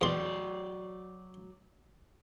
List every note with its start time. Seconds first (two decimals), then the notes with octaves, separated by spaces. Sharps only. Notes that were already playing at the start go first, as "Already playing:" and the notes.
0.01 E2 F#3 D5 C6